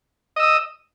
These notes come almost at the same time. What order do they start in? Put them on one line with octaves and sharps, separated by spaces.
D#5 E6 D#6